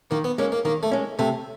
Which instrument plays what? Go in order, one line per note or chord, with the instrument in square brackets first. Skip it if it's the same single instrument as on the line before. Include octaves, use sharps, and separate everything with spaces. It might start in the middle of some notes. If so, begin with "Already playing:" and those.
[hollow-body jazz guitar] D#3 [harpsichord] A#3
[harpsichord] B3
[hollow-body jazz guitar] G#3 C#4 [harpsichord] A#3
[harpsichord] A#3
[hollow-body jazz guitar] D#3 [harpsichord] A#3
[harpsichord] A3
[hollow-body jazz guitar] G#3 C#4
[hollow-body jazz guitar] C3 [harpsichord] A3